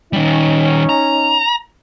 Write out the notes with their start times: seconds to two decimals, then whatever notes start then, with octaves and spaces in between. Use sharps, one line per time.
0.13 D#3 G3 C#4 D#4
0.89 A#5